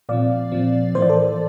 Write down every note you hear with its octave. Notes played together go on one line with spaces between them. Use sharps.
A#2 F3 C4 D5 F5
A#2 F3 C4
A2 E3 A#3 C5
D5
A4 C5